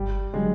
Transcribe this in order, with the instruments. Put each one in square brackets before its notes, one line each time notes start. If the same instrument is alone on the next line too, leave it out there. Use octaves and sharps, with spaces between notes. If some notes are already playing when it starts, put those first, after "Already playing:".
Already playing: [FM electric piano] G1 [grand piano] G3
[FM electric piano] D3 F#3 [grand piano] G#3